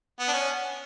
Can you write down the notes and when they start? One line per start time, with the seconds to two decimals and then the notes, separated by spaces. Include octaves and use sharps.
0.19 B3
0.28 D4
0.33 C#4